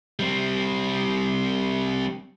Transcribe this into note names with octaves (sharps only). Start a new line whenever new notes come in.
G3 C4